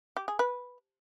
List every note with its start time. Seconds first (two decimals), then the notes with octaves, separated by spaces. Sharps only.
0.17 G4
0.28 G#4
0.39 B4